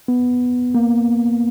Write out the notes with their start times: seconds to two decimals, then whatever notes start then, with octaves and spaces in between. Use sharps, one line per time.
0.08 B3
0.75 A#3